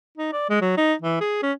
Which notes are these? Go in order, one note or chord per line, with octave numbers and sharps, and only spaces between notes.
D#4
D5
G#3
F#3
D#4
E3
G#4
C#4